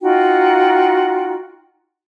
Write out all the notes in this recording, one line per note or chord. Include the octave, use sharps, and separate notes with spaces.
D#4 F4 F#4 G5